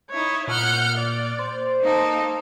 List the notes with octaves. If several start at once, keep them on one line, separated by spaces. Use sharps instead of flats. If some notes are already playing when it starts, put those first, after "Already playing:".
D#4 E4 C#5
A#2 F#5 F6 G6
D5
C5
A#3 D#4 A4